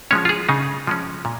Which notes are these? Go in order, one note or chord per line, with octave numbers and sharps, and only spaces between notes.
F3 G#3 C#4 C#5
F4
G#4
C#3 D#4
F3 G#3 C#4
A#2